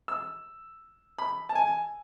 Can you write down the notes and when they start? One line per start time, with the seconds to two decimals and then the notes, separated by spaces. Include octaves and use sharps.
0.08 E6
1.18 B5
1.49 A5
1.55 G#5